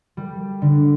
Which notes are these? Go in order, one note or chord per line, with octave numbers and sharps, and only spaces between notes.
G3
D3